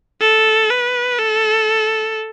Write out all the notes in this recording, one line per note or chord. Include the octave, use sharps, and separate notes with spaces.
A4
B4
A4